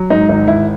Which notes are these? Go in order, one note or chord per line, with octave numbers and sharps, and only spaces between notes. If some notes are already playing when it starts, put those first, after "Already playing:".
Already playing: F#3
G#2 D#4
G#1 D#4
G#1 E4